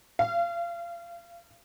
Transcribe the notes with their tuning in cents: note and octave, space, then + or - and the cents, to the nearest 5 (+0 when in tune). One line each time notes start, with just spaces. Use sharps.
F5 -30